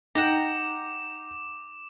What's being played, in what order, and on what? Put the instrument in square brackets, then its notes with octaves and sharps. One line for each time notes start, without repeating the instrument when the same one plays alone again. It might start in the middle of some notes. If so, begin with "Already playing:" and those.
[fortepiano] D#4 [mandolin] F#5 G5 A#5 [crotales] D6 E7